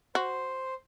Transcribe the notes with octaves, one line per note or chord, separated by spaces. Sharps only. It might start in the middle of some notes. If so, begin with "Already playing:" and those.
F#4 C5